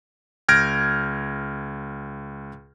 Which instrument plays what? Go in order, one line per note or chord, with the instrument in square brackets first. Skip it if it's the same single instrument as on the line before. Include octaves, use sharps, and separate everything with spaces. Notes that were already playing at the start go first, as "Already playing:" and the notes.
[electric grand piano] C#2 F6 G6 G#6 A#6 D7